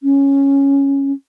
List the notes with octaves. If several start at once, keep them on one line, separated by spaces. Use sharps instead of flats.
C#4